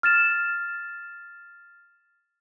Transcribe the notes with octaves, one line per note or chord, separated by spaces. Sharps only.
F6 A6 E7